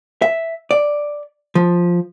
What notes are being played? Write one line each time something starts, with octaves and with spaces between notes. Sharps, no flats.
E5
D5
F3